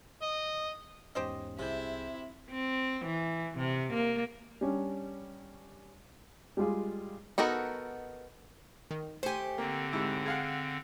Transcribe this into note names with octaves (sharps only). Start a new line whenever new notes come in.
D#5
E2 G#2 C#4 G4 C5 D#5
C2 C3 E4 G#4 G6
C4
E3
C3
A#3
G3 C#4 D4
G3 G#3 F4 G4 G#4
B3 D#4 F#4 A4 A#4
D#3
A3 G4 C5 G#5
D3 A#3 C4
G#2 C3 E4
G#4 F5 F#5